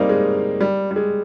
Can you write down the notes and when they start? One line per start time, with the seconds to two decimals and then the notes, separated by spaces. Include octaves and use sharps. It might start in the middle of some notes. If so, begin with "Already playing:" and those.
Already playing: G3 A#3 C4 D#4
0.09 G#3
0.61 G3
0.91 G3
0.96 G#3